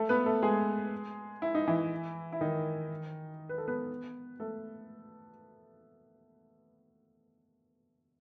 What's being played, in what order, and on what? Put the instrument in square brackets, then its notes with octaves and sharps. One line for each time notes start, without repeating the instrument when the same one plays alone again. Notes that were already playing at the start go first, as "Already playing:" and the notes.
Already playing: [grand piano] A3 A4
B3 B4
A3 A4
G#3 G#4
E4
D#4
E3 E4
E4
D#3 D#4
B4
A4
B3 B4
A3 A4